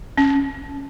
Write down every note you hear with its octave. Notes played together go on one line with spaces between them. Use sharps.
C#4